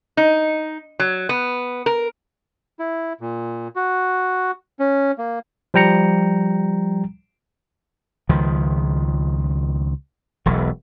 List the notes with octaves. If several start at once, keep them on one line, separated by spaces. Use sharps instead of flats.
D#4
F#3
B3
A#4
E4
A#2
F#4
C#4
A#3
F3 G3 G5 A#5 C#7
C#2 D#3 F3
E1 B1 E2